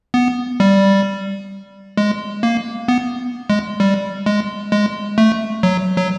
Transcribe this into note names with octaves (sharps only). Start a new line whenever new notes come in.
B3
G3
G#3
A#3
B3
G#3
G3
G#3
G#3
A3
F#3
F#3